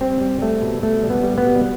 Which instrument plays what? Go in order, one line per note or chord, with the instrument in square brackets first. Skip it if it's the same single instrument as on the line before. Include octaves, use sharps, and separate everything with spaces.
[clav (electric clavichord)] G3 C4
G3
G3 A3
B2
B2 A3
G3
B3
G3
B3
B2